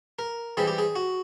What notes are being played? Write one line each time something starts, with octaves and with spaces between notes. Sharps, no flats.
A#4
E3 G3 C4 G#4
G4
G#4
F#4